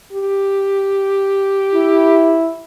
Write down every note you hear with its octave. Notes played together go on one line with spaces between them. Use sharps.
G4
E4